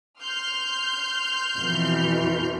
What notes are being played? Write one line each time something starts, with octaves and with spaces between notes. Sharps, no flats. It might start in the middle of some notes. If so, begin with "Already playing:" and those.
C6 F6 G6
F2 B2 E3